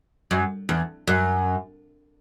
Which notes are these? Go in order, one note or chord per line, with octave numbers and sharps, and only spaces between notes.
F#2
E2
F#2